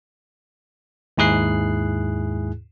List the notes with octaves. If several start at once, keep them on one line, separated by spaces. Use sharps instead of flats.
D#2 G#2 E4 G#4 F#6 C7